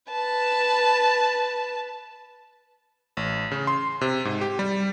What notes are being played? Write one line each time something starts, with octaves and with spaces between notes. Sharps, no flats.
B4 A5
A1
C#3
C6
C3
G#2
G4
G3